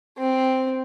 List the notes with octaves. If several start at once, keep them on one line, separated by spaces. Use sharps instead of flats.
C4